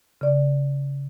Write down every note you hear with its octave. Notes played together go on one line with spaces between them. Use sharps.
C#3 D5